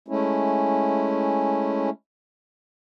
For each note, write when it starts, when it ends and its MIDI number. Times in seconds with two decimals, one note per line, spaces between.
0.08 1.90 56
0.08 1.90 57
0.08 1.90 61
0.08 1.90 64